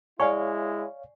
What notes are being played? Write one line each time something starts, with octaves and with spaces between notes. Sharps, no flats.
G#3 E4 C#5 D5 F5 G#5 C#6